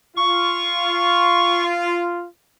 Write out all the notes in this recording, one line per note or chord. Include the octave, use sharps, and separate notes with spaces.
F4 C#6